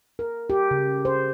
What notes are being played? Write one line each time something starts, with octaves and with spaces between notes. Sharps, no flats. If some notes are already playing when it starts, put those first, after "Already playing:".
A#4
G4
C#3
C5